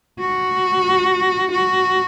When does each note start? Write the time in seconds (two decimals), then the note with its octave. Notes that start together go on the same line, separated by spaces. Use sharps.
0.20 F#4
1.52 F#4